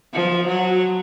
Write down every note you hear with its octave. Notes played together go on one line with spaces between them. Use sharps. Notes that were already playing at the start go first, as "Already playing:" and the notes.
F3
F#3